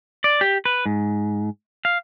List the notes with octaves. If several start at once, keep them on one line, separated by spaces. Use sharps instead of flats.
D5
G4
B4
G#2
F5